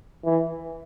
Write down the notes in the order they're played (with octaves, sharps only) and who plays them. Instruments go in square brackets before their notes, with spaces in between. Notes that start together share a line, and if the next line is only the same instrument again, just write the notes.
[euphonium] E3